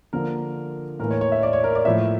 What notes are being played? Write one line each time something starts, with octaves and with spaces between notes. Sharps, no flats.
D3 F3 A#3 A#4
A2 E3 A#3 A#4
C#5
C#5
E5
D5
C#5
A#4
D5
A2 F3 A#3 E5